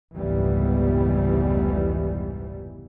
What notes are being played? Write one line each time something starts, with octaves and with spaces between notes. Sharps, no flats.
F1 C#2 G#2 E3 G3 B3